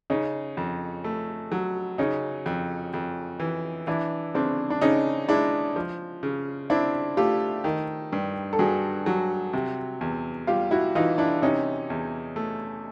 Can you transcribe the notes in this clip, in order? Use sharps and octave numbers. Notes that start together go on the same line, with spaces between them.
C#3 C#4 D#4
F2
A3
F#3
C#3 C#4 D#4
F2
F2
E3
E3 D4 E4
C#3 C4 D4
D4
C#3 C#4 D#4
G#3 D4 E4
F3
C#3
C4 D4 E4
A3 F4 G4
D#3
G2
A4
G2 F#4 G#4
F#3
C3
E2
G3 F4 G4
E4 F#4
E3 D#4 F4
D4 E4
C3 C#4 D#4
E2
A3